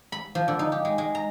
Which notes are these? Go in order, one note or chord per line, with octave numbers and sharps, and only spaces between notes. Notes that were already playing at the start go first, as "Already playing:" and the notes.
B5
F3
D3
D#4
G4
G#3
G#3
A#5